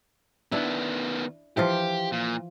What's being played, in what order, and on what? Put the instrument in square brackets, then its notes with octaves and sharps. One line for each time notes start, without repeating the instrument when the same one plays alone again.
[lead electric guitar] D#3 B3 [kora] D4 E4
[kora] E3 F3 F4 [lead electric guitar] G4
[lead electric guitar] A#2